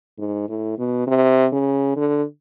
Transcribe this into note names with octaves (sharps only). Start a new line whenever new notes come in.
G#2
A2
B2
C3
C#3
D3